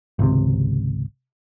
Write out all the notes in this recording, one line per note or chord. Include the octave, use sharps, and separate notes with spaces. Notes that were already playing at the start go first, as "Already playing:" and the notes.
G#1 C#2 C3